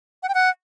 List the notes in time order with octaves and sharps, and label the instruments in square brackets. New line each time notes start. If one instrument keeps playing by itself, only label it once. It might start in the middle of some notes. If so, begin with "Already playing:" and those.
[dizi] F#5
G5
F#5